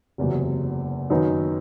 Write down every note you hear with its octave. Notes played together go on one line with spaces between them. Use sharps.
F#1 E2 C3 F#3
F#2 D#3 F#3 B3 D#4